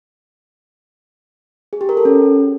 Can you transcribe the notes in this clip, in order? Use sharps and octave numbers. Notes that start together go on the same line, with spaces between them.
G#4
G4
A#4
A4
C#4